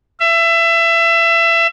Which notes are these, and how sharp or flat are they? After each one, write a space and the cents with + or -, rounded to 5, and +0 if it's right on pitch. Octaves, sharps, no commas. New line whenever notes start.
E5 +25